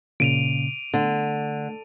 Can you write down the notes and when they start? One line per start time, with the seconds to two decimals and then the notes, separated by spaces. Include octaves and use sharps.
0.20 A#2 C#3 D7 D#7 F7
0.94 D3 A3